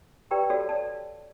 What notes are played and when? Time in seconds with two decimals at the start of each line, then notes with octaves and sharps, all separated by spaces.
0.31 F4 G4 B4 D5 G5 A#5
0.50 F#4 A4 C#5 D5 F5
0.69 D5 A5